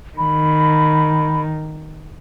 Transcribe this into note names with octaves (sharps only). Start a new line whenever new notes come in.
D#3 B5